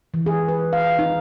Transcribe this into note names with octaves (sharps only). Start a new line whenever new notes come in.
E3
G#4
B4
F5
D#4